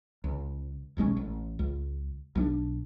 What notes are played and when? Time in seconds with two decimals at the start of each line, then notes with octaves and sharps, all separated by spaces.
0.24 C#2
0.97 D#1 B1 G#3 C#4
1.16 A1
1.59 C#2
2.35 B1 G3 D4